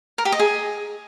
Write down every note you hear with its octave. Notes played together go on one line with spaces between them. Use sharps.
A#4
G4
D#5
G#4